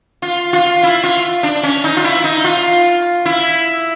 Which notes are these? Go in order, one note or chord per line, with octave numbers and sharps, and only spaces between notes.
F4
F4
E4
F4
D4
C#4
D#4
F4
E4
D#4
F4
E4